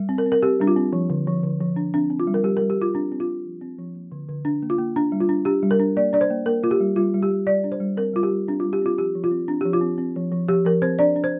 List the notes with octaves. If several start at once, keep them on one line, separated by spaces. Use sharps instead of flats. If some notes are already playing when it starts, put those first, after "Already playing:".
Already playing: G3
C4
A#4
C4
A#4
C4 G4
G3 D4
F4
C4
F3
D3
F3
D3
F3
D4
C4 D4
C4
F4
G3
A#4
G3 G4
A#4
G3
G4
G3 F4
C4 D4
C4
F4
C4
F3
C4
F3
A#3
D3
D3
D4
A#3
F4
A#3
D4
G3
F4
D4
D4 G4
G3
A#4
D4
A#3 D5
D4 D5
C5
A#3
A#3 A#4
A#3 F4
G4
G3
G3 F4
G3
G4
G3
G3 D5
D4
C5
G3
C4 A#4
G3 F4
G4
G3
C4 D4
F4
G3
G4
C4 F4
F3 G4
F3
F4
C4
C4 D4
F3 G4
F4
C4
C4
F3
F3
F3 G4
F3 A#4
C4 C5
D4 D5
D4
C5